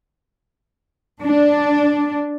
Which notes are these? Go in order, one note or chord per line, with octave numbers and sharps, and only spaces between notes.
D4